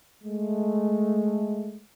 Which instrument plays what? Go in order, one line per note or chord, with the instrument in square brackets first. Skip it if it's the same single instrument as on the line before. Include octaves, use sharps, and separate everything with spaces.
[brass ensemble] G#3 A3